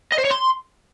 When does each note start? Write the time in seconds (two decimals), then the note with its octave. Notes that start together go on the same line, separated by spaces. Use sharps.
0.12 D#5
0.18 C5
0.25 C#5
0.31 C6